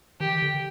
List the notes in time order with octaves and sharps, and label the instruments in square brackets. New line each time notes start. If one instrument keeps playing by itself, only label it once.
[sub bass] D#3 [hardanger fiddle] G4
[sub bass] D3